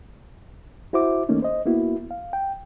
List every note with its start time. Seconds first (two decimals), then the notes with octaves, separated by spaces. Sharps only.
0.93 E4 F#4 C5 E5 D6
1.29 D#3 A3 A#3 C#4 D#4
1.42 C5 D#5
1.66 A#3 B3 E4 F#4
2.11 F5
2.33 G5